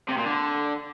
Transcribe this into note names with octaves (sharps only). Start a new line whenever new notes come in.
C3
A#2
D3